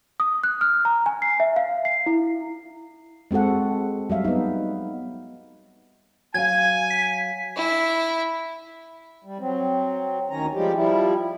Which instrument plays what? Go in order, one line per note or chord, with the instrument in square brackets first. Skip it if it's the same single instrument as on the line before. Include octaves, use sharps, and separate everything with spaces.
[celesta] D#6
F#6
F6
A#5
G#5
C7
E5
F5
C7
E4
[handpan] G#3 C4 F#4 A4 F#5
F#3 G3 E5 F5
B3 D#4
[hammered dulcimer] F#3 F5 [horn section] G#5 [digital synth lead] G#6
[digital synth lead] B6
[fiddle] E4 E5
[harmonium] G3
F#3 C4
D2 D#3 C#4 A#5
F3 G3 G#3 G4
F3 G3 E4